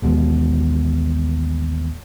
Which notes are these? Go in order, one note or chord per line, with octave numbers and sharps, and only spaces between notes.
A1 D#2 B2 G#3